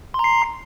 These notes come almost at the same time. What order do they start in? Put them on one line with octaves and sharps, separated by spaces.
C6 A#5 C7